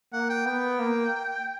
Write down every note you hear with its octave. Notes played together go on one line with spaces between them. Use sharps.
A#3 F#5
G5
B3 G5
A#3